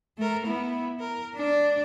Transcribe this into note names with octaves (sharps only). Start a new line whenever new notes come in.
A3 A#4
B3 E4
A#4
D4 D5